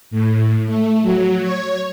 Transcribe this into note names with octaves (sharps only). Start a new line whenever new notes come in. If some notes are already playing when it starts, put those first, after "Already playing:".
A2
A3
F#3
C#5